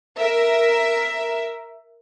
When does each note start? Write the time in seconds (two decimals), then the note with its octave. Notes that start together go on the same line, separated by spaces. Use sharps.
0.18 A#4 E5